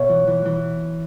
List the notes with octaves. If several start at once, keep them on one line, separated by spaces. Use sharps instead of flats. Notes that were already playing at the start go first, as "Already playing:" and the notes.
Already playing: B2 C#5 E5
E3
E3
E3